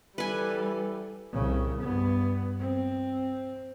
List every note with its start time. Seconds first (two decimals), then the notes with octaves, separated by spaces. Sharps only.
0.18 E3 G3 A4 B4 G#5
1.33 C2 C#3
1.82 G2 B3
2.60 C4